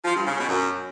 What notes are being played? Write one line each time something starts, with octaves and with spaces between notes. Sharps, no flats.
F3
G2
C#3
B2
F#2